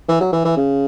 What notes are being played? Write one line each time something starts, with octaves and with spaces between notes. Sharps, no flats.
E3
F#3
E3
E3
C#3